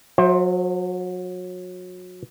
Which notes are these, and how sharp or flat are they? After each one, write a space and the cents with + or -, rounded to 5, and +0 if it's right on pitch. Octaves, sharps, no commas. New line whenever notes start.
F#3 -30 C5 +20 E5 +0